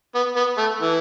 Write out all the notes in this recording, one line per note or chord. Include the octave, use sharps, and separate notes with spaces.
B3
B3
A3
E3